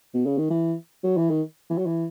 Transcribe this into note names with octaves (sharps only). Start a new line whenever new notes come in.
B2
C#3
D#3
E3
F#3
E3
D#3
E3
F#3
E3